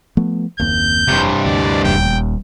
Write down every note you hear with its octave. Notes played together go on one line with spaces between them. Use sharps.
F3 A3 B3
F#1 D#2 A#3 C4 G6
F1 G2 C3
D2 D5
D#1 D#2 G5